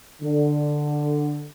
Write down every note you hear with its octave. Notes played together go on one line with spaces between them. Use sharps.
D3